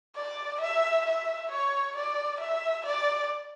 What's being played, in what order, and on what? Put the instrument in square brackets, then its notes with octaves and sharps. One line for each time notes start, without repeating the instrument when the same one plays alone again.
[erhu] D5
E5
E5
C#5
D5
E5
D5